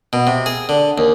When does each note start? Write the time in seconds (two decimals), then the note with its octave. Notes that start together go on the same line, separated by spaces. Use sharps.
0.13 B2
0.27 C3
0.46 G#4
0.69 D3
0.98 D#2